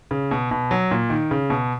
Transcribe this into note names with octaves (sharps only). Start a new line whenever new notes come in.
C#3
B2
B2
F#3
A#2
D#3
C#3
B2